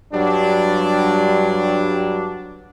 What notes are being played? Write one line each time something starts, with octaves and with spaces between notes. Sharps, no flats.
G2 F#3 G3 D4